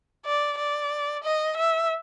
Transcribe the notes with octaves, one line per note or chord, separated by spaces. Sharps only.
D5
D5
D#5
E5